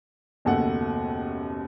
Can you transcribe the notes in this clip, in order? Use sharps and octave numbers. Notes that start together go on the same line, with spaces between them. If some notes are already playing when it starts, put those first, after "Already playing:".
F#1 D#2 B2 A3 F#5